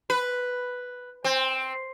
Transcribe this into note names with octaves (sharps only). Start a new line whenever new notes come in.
B4
C4